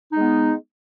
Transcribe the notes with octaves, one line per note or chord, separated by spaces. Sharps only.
G#3 B3 D#4